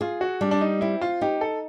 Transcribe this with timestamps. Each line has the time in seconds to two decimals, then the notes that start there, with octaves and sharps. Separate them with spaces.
0.01 F4 G#4
0.21 F#4
0.41 G3 D4
0.51 D4
0.61 D#4
0.81 C4 E4
1.02 F4
1.21 D#4 G4
1.41 A4